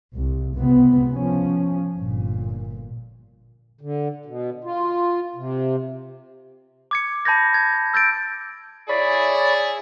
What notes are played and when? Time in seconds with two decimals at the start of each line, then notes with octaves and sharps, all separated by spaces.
0.15 C2
0.57 C#2 C3 B3
1.11 F3 C#4
1.95 G1 A#2
3.81 D3
4.26 B2
4.64 F4
5.36 C3
6.91 D6 G#6 C#7
7.25 A5 B5 G6 G#6 A#6
7.54 G#6
7.94 E6 G6 A6 D7
8.89 E4 G#4 C#5 D5 B5